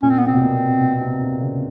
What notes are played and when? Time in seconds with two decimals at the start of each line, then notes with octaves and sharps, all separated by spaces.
0.03 A#2 C#4
0.10 C4
0.18 B3
0.27 C3 C4
0.34 B2
0.41 A#2
0.81 B2
1.01 C3
1.22 C3
1.41 C#3